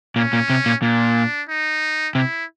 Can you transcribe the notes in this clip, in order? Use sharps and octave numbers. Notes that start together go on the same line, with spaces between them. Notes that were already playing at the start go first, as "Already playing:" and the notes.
A#2 C#4
A#2
C3
A#2
A#2 D4
D#4
C3 E4